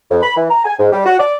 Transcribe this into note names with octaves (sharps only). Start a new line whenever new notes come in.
F2
B5
E3
A#5
G#5
G#2
G3
F#4
D5